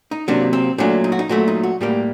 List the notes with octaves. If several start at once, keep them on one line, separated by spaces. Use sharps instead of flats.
D#4
C3 F#3 A#3 D4
C4
A#2 F#3 A3 D4
D#4
F#4
D#4
A#2 F#3 A3 F#4
D#4
F#4
A2 G3 A#3 G4